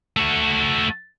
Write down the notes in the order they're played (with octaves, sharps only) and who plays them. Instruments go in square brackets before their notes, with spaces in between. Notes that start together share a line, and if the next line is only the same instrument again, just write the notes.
[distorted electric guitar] A3 F#4